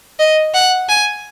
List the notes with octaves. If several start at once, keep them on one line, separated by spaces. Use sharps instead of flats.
D#5
F#5
G#5